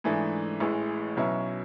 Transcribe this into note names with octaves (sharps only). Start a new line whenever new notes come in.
G#2 E3 A3 D4 G#4
A1 A2 E3 G#3
B1 B2 F#3 C#4 E4